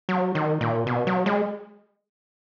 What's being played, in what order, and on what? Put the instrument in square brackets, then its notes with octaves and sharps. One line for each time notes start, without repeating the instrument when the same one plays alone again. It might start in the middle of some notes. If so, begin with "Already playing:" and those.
[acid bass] F#3
D#3
A#2
B2
F#3
G#3